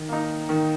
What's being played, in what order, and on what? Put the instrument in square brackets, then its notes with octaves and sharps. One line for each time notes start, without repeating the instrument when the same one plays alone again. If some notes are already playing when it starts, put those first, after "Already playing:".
Already playing: [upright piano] D#3
A#3 D#4
D#3